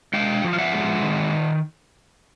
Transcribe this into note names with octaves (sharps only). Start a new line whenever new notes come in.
G#3 F5 G5
F3
F5
E5 F#5
G#3
D#3